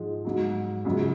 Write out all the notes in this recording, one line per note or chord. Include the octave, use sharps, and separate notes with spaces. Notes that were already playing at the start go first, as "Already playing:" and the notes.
Already playing: G#2 F3 G#3
G#2 F#3
F#2 C#3 F3 G#3